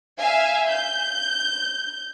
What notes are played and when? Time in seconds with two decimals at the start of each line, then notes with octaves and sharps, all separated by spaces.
0.18 E5 F5 G#5
0.69 G6